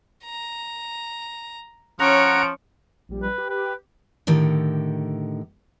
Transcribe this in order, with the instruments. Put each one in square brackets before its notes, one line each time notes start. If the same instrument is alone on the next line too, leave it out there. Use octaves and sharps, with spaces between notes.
[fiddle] A#5
[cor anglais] F3 [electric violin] C#4 D7 [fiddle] C#5 [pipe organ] F#5 A#5
[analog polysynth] A#1 G3
[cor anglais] B4
[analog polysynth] G4
[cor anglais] B4
[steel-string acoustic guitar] A2 D3 D#3 G4